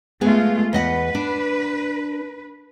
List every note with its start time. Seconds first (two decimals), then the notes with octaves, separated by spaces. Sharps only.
0.21 G#3 A3 B3 F4 G#4
0.73 E2 B4 D#5 F#5
1.15 D4